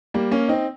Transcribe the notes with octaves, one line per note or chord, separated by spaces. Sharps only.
G3 A#3
A#3 C#4
C4 D#4